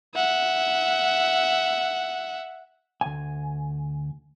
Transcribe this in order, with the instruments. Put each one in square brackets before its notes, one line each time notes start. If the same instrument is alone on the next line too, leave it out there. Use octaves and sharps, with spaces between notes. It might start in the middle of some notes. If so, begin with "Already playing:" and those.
[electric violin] E5 F#5
[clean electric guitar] D2 G#5